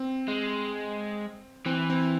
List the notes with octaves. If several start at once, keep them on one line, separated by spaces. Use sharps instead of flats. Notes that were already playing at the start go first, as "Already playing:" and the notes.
Already playing: C4
G#3
E3 C4
C4